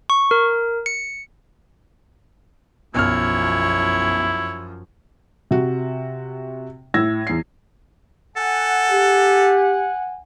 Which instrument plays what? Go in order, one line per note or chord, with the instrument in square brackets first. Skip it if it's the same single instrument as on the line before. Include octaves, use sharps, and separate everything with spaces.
[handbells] C#6
A#4
C#7
[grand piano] B1 F6 [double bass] F#2 F3 [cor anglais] E4 [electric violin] C#5
[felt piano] C3 F#4
A2 E4 E6 G#6 A#6
E2 C7
[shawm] A4 [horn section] F#5 G#5
[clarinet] G4